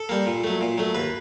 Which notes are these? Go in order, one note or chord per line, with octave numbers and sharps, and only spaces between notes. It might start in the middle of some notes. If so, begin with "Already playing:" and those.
Already playing: A4
G3 A#3
A#2
F#3 A3
A#2
F#3 A3
D#2 B4